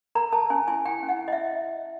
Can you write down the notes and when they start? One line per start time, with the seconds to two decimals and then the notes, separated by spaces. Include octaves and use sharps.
0.15 A#4 A#5
0.32 A#4 A5
0.50 C#4 G#5
0.68 E4 G#5
0.86 E4 G5
1.03 C#4
1.09 F#5
1.20 E4
1.28 D#5
1.32 E5